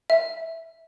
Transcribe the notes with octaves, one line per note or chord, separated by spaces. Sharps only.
E5